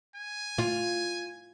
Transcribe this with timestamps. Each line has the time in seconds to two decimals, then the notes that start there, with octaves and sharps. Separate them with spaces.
0.15 G#5
0.58 F4